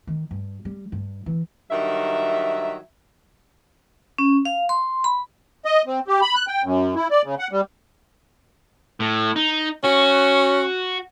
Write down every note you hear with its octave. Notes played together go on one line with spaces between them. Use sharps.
D#3
G2
G3
G2
E3
G2 D#3 F#3 E5
C#4
F5
C6
B5
D#5
C4
G4
B5
F#6
G5
F#2
E4
D5
C#3
F#5
G3
A2
D#4
C#4 F#4